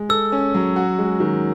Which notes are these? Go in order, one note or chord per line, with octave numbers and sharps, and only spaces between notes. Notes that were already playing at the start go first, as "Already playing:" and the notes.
Already playing: G#3
A4 E6
C#4
F#3
F#4
G#3
D#3